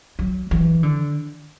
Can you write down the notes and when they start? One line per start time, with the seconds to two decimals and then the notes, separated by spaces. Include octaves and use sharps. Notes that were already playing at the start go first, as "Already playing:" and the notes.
0.19 F#3
0.51 E3
0.83 D3